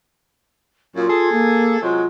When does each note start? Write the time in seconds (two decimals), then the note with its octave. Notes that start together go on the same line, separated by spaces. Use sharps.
0.96 F#2 A#2 F4
1.09 G#4 A4
1.32 A#3
1.82 C3 F#3 G#3 F4